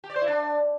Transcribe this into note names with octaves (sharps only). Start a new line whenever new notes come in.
G4
D5
C5
E4
D4